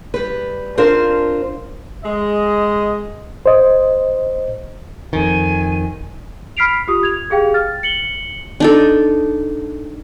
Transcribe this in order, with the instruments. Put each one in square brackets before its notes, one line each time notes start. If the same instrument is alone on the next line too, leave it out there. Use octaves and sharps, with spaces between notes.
[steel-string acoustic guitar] G3 B4
C4 D4 F4 A#4 C5
[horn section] G#3 D#5
[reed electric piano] C5 D#5
[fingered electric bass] F2 D#3 [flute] G#5
[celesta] B5 F6 B6 C7 D7 F7
F4 G4 D#6
G#6 F7
G4 G#4 F5 G5
F6 A6
C#7 F#7 G7
[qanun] D4 D#4 A4